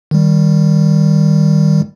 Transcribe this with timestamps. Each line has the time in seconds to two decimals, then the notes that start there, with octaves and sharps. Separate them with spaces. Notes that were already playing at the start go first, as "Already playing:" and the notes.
0.11 D#3 G3